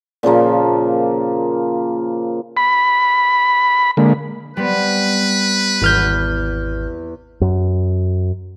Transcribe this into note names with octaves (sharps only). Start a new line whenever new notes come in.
A#2 C#3 F3 A#3
B5
D3 G#3 A#3
G3 B3 C4 B4
G#1 E2 F6 G6
F#2